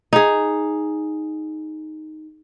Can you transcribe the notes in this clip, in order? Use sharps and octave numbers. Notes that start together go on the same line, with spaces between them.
D#4 G#4